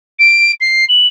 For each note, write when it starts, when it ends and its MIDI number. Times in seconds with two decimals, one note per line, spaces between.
0.19 0.52 98
0.60 0.85 96
0.89 1.07 102